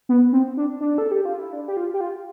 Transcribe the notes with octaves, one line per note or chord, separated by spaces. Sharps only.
B3
C4
D4
D4
A4
G4
F4
E4
D4
G4
F4
G4
F4